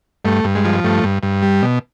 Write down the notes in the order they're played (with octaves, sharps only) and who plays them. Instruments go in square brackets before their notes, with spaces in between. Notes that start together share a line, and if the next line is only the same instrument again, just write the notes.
[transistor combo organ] G2 A3
G2
G#3
F3
G2 A3
G2
G2
G3
B2